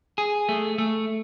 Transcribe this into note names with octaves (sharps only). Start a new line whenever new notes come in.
G#4
A3
A3